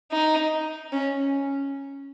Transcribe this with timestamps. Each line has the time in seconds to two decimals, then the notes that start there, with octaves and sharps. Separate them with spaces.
0.12 D#4
0.92 C#4